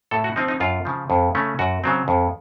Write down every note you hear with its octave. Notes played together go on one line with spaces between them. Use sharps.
A2 A4
F#4
F3 C4 D#4
D#4
F#2 F4
C#3 F3
F2
C#3 A3 C#4
F#2 F#4
C#3 F#3 C4
F2